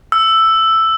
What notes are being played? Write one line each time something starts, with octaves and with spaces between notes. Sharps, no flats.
E6